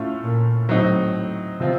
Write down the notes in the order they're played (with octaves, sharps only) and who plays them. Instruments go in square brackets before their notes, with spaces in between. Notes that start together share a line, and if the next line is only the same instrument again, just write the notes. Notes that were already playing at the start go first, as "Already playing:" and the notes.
Already playing: [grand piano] A2 A3 C#4 F4
[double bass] A#2
[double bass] A2 [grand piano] F#3 C4 D#4
[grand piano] C3 F3 C4 F4